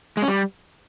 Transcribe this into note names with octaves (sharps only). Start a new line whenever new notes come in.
G#3
C#4
G3